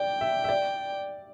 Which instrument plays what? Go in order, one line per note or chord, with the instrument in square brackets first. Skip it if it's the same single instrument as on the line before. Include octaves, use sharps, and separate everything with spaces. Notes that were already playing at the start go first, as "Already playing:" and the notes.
Already playing: [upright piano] D5 [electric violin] G5
[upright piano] E5
E5
D5